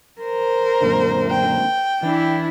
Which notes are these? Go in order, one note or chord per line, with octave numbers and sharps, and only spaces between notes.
A#4 C5
F#2 A#2 D3
G5
E3 D4 E4